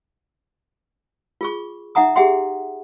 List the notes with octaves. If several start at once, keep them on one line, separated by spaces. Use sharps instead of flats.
F4 G#4 C#6
D#4 E5 F#5 A#5 D#6
G4 G#4 E5 F#5 G5 C6